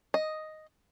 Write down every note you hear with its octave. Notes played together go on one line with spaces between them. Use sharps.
D#5